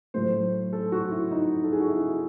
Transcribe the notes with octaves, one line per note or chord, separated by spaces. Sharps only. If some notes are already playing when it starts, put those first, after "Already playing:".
A2 F#3 A3 C5
A4
F#4
E4
D#4
A4
G#4
F#4
E4